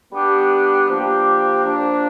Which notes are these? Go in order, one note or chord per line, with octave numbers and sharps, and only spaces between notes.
G3 B3 D4 G4
F3 A#3 D4 G4
F3 A#3 D4